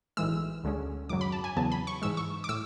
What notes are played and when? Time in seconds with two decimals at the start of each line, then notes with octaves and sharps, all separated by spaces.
0.17 B1 A2 E3 G#3 E6
0.64 D2 D3 G#3 C#4
1.09 G#1 F#2 C#3 F#3 D6
1.21 B5
1.32 A5
1.44 G#5
1.56 E2 C#3 F#3 B3 A5
1.72 B5
1.87 C#6
2.02 G#2 E3 G#3 E6
2.17 C#6
2.44 D6
2.49 A2 E6